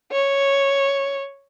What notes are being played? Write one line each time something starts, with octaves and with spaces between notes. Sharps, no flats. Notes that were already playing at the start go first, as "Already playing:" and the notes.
C#5